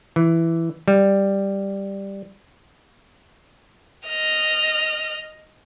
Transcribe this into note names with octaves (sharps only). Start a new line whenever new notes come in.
E3
G3
D#5 F6